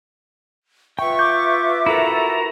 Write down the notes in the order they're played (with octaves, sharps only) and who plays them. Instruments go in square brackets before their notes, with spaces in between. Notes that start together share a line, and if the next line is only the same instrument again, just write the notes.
[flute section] F4 B4 E5 [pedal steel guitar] G5 [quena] C#6
[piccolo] D6 [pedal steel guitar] G6
[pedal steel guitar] E4 F#4 A#4 [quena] A4 [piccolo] A#5